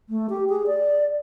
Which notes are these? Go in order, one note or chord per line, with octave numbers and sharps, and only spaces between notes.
A3
G4
G#4
D5